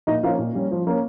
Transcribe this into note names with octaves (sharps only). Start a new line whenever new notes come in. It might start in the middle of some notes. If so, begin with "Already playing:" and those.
A#2 D#4 D#5
F3 A#3 C#4 F4 F5
A#2
G3 C#4
F3
A#3 C#4